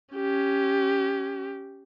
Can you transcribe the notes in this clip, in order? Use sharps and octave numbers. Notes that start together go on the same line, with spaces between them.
C#4 G4